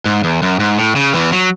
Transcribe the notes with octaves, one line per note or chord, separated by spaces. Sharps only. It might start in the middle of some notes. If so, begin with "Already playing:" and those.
G#2
E2
F#2
G#2
A2
C#3
E2 E3
F#3